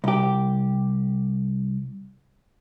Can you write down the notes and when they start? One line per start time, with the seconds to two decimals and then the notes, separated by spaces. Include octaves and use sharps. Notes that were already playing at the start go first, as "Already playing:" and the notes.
0.04 C2 G4